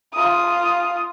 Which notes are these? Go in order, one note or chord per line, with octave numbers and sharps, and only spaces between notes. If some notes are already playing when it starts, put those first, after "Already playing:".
F4 D#6